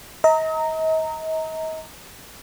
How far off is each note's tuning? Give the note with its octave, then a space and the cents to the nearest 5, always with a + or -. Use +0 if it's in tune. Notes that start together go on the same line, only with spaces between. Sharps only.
D#5 +40 A#5 -15